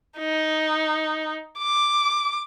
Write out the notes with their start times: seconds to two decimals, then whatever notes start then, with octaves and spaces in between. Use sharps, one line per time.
0.18 D#4
1.59 D6